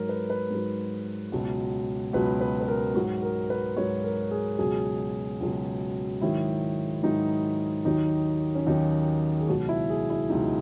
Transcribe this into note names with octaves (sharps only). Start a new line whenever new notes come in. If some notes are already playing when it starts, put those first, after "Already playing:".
Already playing: G#2 F#3 A#4
B4
B4
G#2 F#3
C#2 B2 F#3
C#2 B2 F#3 B4
B4
B4
A#4
G#2 F#3 F#4
A#4
B4
G#2 F#3 C#5
A#4
G#4
C#2 B2 F#3 G#4
C#2 B2 F#3
G#2 D#3 F#3 E4
G#2 D#3 F#3 D#4
D#2 D#3 F#3 D#4
C#4
D#2 D#3 F#3 D#4
G#4
C#2 B2 F#3 F#4
E4
G#4
E4
C#2 B2 F#3 D#4